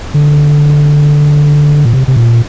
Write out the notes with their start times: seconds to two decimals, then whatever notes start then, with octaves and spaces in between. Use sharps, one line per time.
0.14 D3
1.85 A#2
1.93 C3
2.08 C3
2.16 A#2